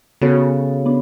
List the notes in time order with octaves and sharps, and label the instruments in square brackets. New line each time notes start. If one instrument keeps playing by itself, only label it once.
[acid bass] C#3 [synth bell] B3 F#4 A4 C#5
[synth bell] B3 D4